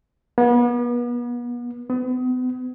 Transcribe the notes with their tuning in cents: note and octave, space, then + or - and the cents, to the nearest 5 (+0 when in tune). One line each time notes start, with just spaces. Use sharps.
B3 -35
B3 +40